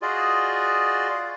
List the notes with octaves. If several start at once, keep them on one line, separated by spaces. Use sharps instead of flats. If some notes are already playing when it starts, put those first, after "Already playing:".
F4 F#4 G#4 D5 D#5